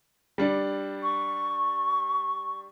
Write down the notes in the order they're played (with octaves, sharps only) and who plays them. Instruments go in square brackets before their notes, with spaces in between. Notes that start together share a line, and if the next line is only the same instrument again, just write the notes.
[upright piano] G3 D4 D5
[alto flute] C#6